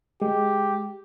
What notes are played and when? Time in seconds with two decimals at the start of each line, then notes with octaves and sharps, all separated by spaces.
0.22 G#3 G4